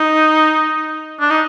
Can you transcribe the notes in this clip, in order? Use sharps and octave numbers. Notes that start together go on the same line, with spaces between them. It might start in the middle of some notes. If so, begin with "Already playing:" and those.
Already playing: D#4
D4
D#4